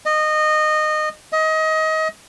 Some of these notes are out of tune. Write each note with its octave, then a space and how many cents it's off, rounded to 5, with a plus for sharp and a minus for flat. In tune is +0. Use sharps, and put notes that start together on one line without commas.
D#5 -20
D#5 +25